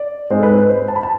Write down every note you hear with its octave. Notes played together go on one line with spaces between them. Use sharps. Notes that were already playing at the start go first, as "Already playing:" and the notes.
Already playing: D5
G#2 G#3 C4 C5
A4
B4
B4
C5
A5
B5
A5